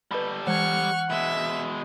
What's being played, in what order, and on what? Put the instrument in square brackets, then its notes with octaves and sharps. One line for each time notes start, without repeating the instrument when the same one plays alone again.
[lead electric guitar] G3 A4 [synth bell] B4 B5
[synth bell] E3 G#6 [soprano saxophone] F#5 [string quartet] C#6 F6
[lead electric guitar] B2 G#3 [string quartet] E5